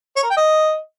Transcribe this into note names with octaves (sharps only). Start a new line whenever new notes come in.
C#5
A#4
G5
D#5